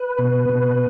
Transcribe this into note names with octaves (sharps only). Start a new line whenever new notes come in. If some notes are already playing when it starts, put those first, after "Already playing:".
Already playing: B4
B2
B2